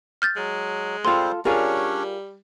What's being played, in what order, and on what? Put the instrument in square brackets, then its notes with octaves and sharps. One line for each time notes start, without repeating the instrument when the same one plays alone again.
[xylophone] F6 G6 A6
[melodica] F#3 [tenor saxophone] G#3
[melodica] G3 C4 C5 [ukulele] F4 A4 [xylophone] C6
[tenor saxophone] G3 [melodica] C#4 D4 C#5 [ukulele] F4 G#4 A#4